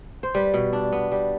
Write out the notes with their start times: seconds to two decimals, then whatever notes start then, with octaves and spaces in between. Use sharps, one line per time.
0.23 C5
0.34 G3 B4
0.54 B2
0.73 D4
0.92 B3
1.12 G3